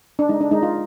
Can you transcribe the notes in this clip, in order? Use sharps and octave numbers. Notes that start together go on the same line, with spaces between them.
D4
G#3 D#4
D4
G#3 D#4
F4